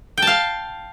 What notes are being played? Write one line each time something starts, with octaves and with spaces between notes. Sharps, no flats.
F5 G5 A5